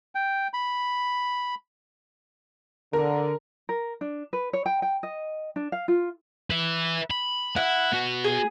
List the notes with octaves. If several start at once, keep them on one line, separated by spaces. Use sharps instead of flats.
G5
B5
D3 A#4
A#4
D4
B4
C#5
G5
G5
D#5
D4
F5
F4
B4 E5
B5
E4 F#5
B3 F#4
G#4